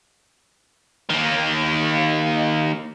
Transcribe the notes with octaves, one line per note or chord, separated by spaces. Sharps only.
D#3 A#3